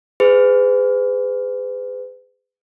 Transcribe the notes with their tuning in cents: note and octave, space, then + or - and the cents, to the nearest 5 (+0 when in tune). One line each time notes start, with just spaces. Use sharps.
G#4 -15 B4 +40